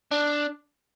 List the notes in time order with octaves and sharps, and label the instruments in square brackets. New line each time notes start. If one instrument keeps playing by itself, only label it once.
[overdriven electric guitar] D4